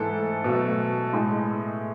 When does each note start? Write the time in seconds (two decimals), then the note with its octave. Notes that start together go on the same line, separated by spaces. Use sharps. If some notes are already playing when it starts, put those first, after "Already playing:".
Already playing: G#2 E3 A3 A4
0.44 B2 F#3 A3
1.13 A2 G#3